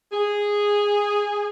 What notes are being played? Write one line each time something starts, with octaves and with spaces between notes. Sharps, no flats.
G#4